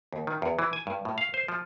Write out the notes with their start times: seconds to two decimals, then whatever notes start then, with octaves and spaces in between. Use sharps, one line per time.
0.13 D#2
0.27 D#3
0.42 E2
0.59 E3
0.73 G#5
0.87 G2
1.05 A2
1.18 F5
1.34 C5
1.48 F3